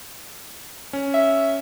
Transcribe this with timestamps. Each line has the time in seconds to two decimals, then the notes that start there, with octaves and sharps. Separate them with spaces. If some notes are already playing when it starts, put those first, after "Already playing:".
0.93 C#4
1.14 E5